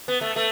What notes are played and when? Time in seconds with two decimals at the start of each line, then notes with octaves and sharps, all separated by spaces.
0.08 B3
0.21 A3
0.36 A3